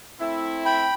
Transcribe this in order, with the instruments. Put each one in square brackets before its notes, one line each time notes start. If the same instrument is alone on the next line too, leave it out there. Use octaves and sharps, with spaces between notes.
[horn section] A3 C4 E4
[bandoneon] G5 B5